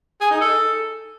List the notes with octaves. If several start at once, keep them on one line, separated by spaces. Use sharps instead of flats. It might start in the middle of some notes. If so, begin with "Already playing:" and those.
G#4
D#4
A4